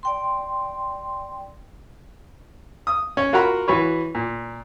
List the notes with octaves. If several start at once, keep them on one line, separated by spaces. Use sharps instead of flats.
D5 G5 C6
D#6
C#4
F4 F#4 A#4 F#5 A#5 B5
E3 F#4 B4 C#5
A#2